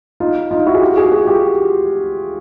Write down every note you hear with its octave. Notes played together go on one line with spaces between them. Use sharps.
D#4 F4
D#4 F4
E4 F#4
G#4
F4 G4
F#4 G#4
F#4 G#4
F4 G4